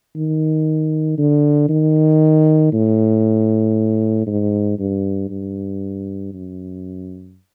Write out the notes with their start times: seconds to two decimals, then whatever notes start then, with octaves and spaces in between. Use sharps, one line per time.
0.15 D#3
1.18 D3
1.69 D#3
2.72 A2
4.27 G#2
4.79 G2
5.30 G2
6.33 F#2